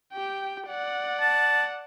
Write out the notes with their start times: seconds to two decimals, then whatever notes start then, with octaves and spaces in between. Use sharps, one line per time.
0.13 G4 G5
0.68 D5 F#5
1.20 A5